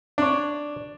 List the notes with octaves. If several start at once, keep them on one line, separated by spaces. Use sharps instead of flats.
D4 C#5 D5